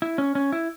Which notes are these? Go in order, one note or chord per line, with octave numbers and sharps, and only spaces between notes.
E4
C#4
C#4
E4